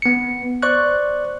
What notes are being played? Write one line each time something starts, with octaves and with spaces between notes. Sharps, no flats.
B3 C#7
C5 D5 C#6 F#6